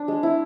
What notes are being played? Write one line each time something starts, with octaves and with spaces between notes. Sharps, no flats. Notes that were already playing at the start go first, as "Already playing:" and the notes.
Already playing: D4
G#3
E4